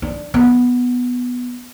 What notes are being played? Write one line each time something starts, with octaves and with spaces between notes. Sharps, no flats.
D4
B3